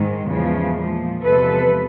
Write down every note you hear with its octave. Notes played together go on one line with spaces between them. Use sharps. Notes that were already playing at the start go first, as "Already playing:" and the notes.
Already playing: G#2 D#3 G#3
E2 C#3 F3 G#3
A#2 F3 G#3
E2 C3 F3 G#3 A4 B4